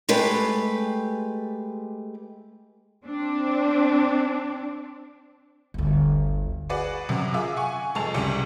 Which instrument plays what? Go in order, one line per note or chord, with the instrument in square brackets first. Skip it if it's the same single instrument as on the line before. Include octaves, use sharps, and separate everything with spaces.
[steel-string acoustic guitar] G#3 A3 G4 B4
[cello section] C4 D4
[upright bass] G1 D2
[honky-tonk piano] F#4 G#4 B4 D5 F#5
F#2 C3 F#3
F4 G#4 E5 D6
F#5 G#5 C#6
F1 G#3 A5 F7
C2 C#3 G4 C#7